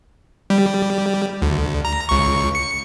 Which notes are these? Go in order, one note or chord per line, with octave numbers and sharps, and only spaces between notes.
G3
D2
A#5
C#2 C#6
C#7